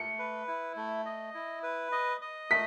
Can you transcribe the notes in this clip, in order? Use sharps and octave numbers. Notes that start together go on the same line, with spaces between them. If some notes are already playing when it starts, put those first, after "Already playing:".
Already playing: A3 C#7
B4
E4
A3
D#5
E4
B4
D#5
D#5
A3 B6